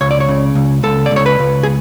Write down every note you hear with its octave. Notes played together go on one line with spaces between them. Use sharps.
C#2 C#5
D5
C#5
C#3
C#2
C#2 A4
D5
C#2
C#5
B4
C#2
G#4